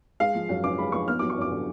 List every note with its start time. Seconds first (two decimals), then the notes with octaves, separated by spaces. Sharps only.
0.20 G#3 F5
0.35 F3
0.49 F#2
0.63 C#3 D6
0.78 G#3 B5
0.92 F3 C#6
1.08 B3 F6
1.19 F#3 D6
1.30 C#6
1.37 F#2 D6
1.52 D3